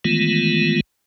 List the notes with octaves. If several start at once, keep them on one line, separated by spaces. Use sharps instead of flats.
D#3 E3 G#3 A3 B3 F4